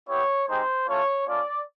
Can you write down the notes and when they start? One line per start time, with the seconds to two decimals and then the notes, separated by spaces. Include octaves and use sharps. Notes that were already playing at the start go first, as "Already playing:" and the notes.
0.08 B3 E4 G4 C#5
0.48 G#3 C4 D#4 G4 C5
0.88 A3 C#4 F4 C#5
1.27 A3 C#4 F4 D5